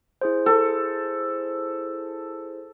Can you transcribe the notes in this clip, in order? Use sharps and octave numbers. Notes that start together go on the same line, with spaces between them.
E4 G#4 C5
A4